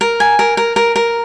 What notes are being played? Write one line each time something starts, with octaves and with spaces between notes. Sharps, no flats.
A#4
G#5
A#4
A#4
A#4
A#4